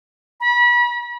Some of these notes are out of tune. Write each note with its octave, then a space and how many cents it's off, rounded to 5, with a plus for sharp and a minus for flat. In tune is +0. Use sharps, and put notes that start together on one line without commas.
B5 -35